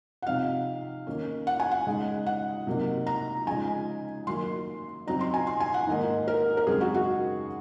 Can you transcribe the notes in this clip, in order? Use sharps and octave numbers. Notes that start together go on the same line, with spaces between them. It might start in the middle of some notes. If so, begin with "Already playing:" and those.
F#5
C3 F3 C4 D#4 F5
D#3 A#3 C#4
F#5
G#5
F#5
C#3 G#3 D#4
F#5
C3 F#3 A#3 D#4
A#5
C#3 F3 G#3 D#4 G#5
D#3 F#3 A#3 C6
C#3 F#3 C4 D#4 A#5
C6
G#5
C6
G#5
F#5
G#2 D#3 A#3 D#4
A#4
A#4
F#2 C#3 G#3 C4 D#4 G#4
F#4
F#4